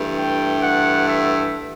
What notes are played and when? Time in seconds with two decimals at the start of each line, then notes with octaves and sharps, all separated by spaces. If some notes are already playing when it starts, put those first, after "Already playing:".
Already playing: G2 E3 A3
0.16 G5
0.62 F#5
1.09 E5